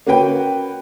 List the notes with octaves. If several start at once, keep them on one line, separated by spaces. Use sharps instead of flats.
A#3 C#4 F#4 B4 G5